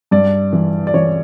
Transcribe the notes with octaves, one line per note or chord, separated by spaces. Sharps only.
G2 D5
E3
D5
E3 C#5